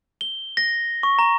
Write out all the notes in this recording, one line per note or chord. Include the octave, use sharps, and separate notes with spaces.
G7
A#6
C#6
A#5